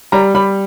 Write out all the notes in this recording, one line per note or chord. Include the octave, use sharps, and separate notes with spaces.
G3 A#5
G3 B5